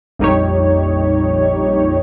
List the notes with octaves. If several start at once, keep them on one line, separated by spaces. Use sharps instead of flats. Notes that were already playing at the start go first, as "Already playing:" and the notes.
A#1 F2 G3 D#4 G4 C#5